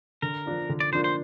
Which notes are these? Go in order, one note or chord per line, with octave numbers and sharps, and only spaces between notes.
D3 A#4
F3 A#3 D4 F4
D3
D5
F3 A#3 D4 F4 C5
C5